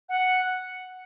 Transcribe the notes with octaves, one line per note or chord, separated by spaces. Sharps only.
F#5